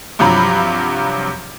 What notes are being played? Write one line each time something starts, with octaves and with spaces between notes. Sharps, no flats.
G2 C3 F3 F#3 A#5 B5